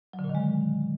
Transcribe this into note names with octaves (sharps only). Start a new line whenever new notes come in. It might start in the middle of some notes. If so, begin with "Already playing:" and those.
F#3
D3
A#2
D#3
G#3